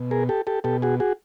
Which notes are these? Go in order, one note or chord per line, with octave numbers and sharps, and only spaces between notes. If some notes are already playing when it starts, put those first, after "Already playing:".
Already playing: B2
G#4 A#4
G4 A4
G4 A4
B2 G4 A4
F#4 G#4
F#4 G#4